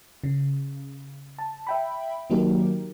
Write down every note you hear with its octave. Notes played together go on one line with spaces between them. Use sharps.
C#3
A5
E5 G5 B5
D#3 F#3 A#3 D#4 G4 A#4